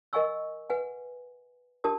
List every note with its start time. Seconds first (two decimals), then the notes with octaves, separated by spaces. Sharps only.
0.13 A#4 D#5 F#5 G#5 C#6 E6
0.70 B4 F#5 G#5
1.84 D4 G4 A#4 A5 D#6